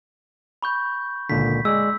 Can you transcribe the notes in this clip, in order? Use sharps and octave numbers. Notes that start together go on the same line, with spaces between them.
B5 C#6 G6
C#2 A#2 D3 B6
G#3 D5 E6